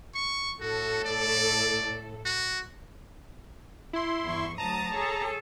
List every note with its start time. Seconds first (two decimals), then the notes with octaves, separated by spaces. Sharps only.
0.15 C#6
0.61 A2 F#4 A4
1.05 D5
2.25 F#4
3.93 E4 C6
4.24 E2 G2 C#6
4.58 D2 F#3 A5 A#5 D#6
4.95 G#4 A4 C#5